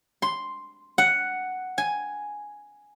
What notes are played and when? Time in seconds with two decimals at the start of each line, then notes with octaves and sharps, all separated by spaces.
0.22 C6
0.98 F#5
1.78 G#5